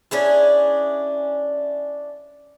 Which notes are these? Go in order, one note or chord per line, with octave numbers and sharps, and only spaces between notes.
C#4 D4 E4 G#4